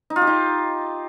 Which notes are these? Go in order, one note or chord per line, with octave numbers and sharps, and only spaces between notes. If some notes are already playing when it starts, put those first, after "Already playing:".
D#4
F4
G4
D#4